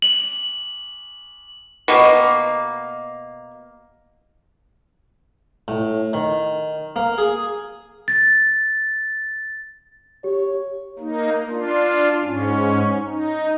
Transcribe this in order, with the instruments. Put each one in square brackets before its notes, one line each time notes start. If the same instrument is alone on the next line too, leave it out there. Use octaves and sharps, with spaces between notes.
[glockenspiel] F#7
[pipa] B2 A#3
[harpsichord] A2
D#3
A#3
G#4
[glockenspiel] A6
[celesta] G4 [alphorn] C#5
[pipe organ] A#3 D#4
D4 F4
G#2 C#4
D#4